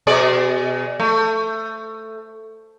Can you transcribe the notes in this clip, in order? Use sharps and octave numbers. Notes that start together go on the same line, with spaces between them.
B2 G#4 D5
A3